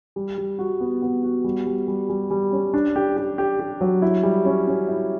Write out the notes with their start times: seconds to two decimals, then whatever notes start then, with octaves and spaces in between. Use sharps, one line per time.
0.16 G3
0.38 G3
0.59 F#4
0.80 B3
1.02 B3
1.23 F#4
1.44 G3
1.66 G3
1.88 G3
2.10 G3
2.31 G3
2.52 C#4
2.74 D4
2.96 G4
3.17 G4
3.38 G4
3.59 G4
3.81 F#3
4.02 E4
4.23 G3
4.45 C#4
4.67 C#4
4.89 E4